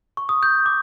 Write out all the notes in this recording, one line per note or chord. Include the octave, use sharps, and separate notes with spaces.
C#6
D#6
G6
D6